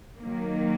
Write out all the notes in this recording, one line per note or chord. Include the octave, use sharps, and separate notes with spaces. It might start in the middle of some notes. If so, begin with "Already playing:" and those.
D#3 F#3 A#3